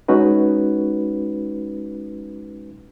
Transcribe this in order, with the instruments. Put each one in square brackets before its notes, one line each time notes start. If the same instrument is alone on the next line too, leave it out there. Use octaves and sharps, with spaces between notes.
[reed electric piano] G#3 C#4 D#4 F#4 B4